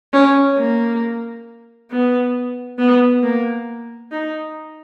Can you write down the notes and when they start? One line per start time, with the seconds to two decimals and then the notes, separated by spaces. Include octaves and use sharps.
0.13 C#4
0.58 A#3
1.91 B3
2.79 B3
3.23 A#3
4.11 D#4